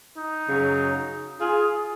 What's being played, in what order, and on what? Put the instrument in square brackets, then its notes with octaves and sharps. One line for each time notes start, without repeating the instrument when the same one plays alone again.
[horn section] D#4
F#2 C#3 F#3
F4 G#4